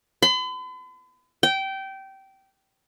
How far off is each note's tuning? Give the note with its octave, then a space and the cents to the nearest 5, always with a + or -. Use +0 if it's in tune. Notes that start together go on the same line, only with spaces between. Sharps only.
B5 +45
G5 -20